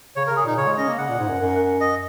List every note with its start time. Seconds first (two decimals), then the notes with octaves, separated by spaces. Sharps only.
0.16 C#3 C#5
0.27 A#4
0.30 C#3
0.37 G#4
0.43 A#2 D#4
0.57 C#3 C#5
0.67 G#3
0.78 C#4 D#5
0.88 A#3
0.98 C#3 F#5
1.09 A#2
1.19 G#2
1.29 F#2
1.40 F#2
1.80 D#5